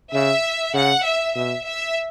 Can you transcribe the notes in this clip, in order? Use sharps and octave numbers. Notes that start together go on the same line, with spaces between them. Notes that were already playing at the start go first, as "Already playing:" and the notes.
C#3 E5
C#3 F#5
E5
B2 E5
E5